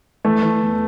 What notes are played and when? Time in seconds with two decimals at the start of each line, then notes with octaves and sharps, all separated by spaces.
0.25 E3 A3
0.42 E3
0.61 E2